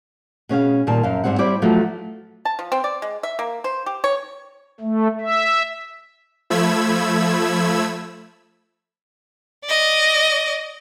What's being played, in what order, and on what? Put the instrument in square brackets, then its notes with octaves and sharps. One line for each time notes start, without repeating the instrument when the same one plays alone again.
[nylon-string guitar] B2 C#4 G#4 F5
A#2 D#3 G3 A5
F#2 F5
G#2 C#3 G3 C4 F#5
G3 E4 G4 C5 D5
F3 F#3 A3 B3 F4 F#4
[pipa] A5
F3
C4
D5
G#3
E5
A#3
C5
G4
C#5
[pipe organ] A3
E5
[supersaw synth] F3 A3 B5 E6 G#6
[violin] D5 D#5